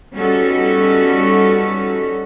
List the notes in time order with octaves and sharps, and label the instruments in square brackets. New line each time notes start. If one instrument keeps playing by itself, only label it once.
[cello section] G3 B3 C#4 D#4 F#4 A4